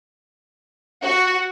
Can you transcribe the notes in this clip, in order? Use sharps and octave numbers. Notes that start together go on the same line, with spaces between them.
F#4